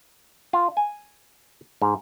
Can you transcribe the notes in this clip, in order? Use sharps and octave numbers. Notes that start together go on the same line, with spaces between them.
F4
G#5
G#2